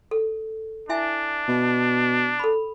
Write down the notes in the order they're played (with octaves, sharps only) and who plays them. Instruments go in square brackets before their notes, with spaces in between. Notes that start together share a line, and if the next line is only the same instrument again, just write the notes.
[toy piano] A4
[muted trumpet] D4 [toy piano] E4 E5 G#5
[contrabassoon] B2
[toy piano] A4 B5